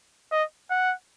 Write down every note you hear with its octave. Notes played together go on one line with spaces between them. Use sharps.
D#5
F#5